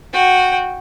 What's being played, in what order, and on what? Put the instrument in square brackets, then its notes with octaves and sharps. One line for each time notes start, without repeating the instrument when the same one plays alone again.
[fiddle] F#4 G5